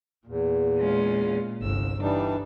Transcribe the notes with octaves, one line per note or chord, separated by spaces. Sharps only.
E2 A#2
G#3 C#4 F4
G1 C2 E6
E3 G3 D4 D#4 A5